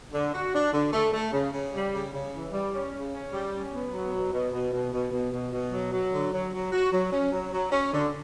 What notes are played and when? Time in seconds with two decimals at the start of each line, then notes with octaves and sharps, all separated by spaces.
0.13 D3
0.34 F#4
0.54 D4
0.73 D3
0.93 A3
1.13 A3
1.33 C#3
1.53 C#3
1.74 G3
1.93 C#3
2.14 C#3
2.33 E3
2.53 G3
2.73 C#4
2.93 C#3
3.13 C#4
3.33 G3
3.53 C#4
3.73 B3
3.93 F#3
4.13 B2
4.33 B2
4.52 B2
4.73 B2
4.92 B2
5.12 B2
5.33 B2
5.52 B2
5.72 F#3
5.93 F#3
6.13 D3
6.33 F#3
6.53 F#3
6.72 F#4
6.92 F#3
7.12 C#4
7.32 F#3
7.53 F#3
7.72 C#4
7.93 D3